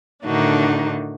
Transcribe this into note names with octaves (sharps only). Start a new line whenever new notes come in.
A2 D3 D#3 D4 D#4 F#4